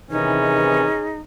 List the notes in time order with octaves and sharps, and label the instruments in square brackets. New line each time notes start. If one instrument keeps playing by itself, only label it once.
[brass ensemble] C3 D#3 E3 [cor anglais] C#4 [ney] D#4 [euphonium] G#4